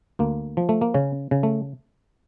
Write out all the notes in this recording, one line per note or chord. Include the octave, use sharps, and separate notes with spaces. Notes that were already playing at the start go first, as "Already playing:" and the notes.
D2 A#3
F3
A3
A#3
C#3 C#4
C#3
A3